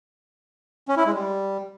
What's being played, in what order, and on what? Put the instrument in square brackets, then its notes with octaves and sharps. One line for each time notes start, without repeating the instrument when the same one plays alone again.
[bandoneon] C#4
E4
G#3
G3